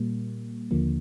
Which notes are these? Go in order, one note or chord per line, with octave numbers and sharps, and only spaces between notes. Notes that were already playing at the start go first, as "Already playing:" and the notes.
Already playing: A#2 G3 A#3
D#2 D3 F3 A#3